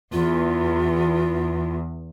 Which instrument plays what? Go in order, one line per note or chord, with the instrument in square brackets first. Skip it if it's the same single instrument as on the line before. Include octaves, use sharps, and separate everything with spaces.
[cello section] E2 [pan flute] F4